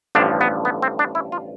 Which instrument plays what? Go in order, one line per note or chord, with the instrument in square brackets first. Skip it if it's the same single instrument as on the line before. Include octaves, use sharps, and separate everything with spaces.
[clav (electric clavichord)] A1 G2 D3 F3 D4
B3
B3
C4
D4
E4
F4